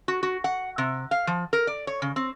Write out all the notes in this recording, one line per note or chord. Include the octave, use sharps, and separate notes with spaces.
F#4
F#4
F#5
C3
F5
F3
A#4
D5
C#5
C#3
C4